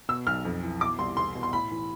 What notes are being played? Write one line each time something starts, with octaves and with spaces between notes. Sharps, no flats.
B2 E6
B1 F6
F2
E3
B2 D6
C2 C6
E2 C6
B2
C6
A2 B5
E3